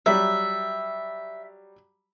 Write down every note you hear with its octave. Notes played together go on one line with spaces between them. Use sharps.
F#3 G3 E5